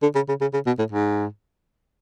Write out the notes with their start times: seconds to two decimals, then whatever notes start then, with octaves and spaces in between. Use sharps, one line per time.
0.02 D3
0.15 C#3
0.28 C#3
0.41 C#3
0.53 C#3
0.66 B2
0.78 A2
0.92 G#2